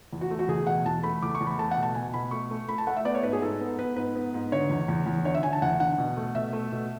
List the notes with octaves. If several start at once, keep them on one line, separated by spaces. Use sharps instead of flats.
E2
F#4
A3
F#4
E2 G#4
B2 F#5
E2 A5
A3 B5
E2 D6
C#6
E2
B5
A3 A5
F#5
B2
A5
B2 G#5
B2 B5
A3 C#6
A3
A3 B5
A5
A3 F#5
E5
B3 D5
C#5
G#2 B4
G#4
G#2 A4
B3
B3 B4
G#2 B4
B3
G#2
D3 C#5
E2
E2
E2
D3 C#5
E5
D3 G#5
A5
E2 F#5
D3 F#5
B2
A3
B2 E5
A3
B2